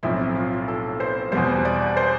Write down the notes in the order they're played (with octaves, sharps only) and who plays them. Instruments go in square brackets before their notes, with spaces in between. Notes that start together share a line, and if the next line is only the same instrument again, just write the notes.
[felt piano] B1 A2 F3 A3 C4 E4
F4
A4
C5
E2 B2 G3 C5
D5
C5